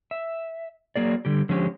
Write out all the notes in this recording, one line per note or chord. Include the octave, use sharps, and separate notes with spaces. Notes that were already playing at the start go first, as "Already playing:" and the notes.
E5
F#3 A#3 G#4 D5
D3 G3 G4
D3 F3 G#3 C#4 G4